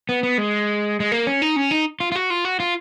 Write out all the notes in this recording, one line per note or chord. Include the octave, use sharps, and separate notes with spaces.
B3
B3
G#3
G#3
A#3
C#4
D#4
C#4
D#4
F4
F4
F#4
F4
F#4
F4